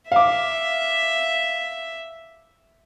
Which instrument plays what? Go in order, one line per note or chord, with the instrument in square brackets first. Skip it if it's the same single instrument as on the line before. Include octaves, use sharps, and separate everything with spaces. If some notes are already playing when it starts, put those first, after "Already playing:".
[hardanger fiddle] E5 [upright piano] F5 D6